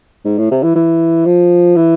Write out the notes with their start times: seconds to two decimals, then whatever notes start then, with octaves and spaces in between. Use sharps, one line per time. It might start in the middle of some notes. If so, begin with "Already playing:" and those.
0.25 G#2
0.38 A2
0.51 C3
0.63 E3
0.75 E3
1.26 F3
1.76 E3